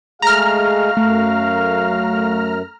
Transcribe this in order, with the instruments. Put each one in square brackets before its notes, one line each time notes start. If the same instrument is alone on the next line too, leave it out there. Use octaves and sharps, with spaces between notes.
[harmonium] G#3 A3 G#4 [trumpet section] F#4 F5 [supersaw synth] A#5 F6
[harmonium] F#2 [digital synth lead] A3